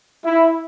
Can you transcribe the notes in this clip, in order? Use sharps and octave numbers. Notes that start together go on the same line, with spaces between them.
E4